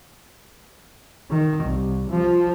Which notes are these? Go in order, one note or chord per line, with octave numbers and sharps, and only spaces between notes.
D#3
C2
F3